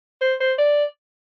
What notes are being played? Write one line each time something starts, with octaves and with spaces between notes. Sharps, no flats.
C5
C5
D5